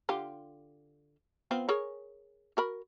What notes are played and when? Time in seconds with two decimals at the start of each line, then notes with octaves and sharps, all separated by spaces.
0.09 D3 F4 G4
1.51 B3 C4 F4
1.69 G#4 A#4 C#5
2.57 F#4 A#4 B5